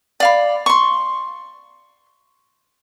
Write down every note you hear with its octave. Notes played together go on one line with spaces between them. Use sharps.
D5 F5 B5
C6 C#6